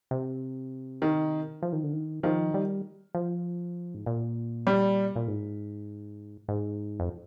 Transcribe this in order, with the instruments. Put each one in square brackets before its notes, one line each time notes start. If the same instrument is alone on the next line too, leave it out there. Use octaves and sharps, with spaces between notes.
[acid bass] C3
[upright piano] D#3
[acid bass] F3
D#3
D3
D#3
[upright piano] D#3 [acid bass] F3
[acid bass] G3
F3
G#2
A#2
[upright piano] G3
[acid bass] A#2
G#2
G#2
F2